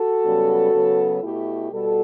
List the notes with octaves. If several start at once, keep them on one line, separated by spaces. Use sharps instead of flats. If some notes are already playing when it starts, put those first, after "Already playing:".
Already playing: F#4 A4
F#2 C#3 G3 B3
C#3 F#3 B3
B2 A3 E4 G4
B2 G3 B3 F#4 A4